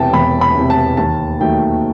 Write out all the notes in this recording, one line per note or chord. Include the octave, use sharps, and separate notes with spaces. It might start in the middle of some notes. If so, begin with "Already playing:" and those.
Already playing: E1 E2 C3 E3 G5 A5
E1 B5
B5
E2 C3 E3
A5
D#2 A5
D#3 F#3 A3 G5